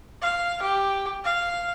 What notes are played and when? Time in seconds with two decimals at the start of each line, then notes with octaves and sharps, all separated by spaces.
0.22 F5
0.62 G4
1.24 F5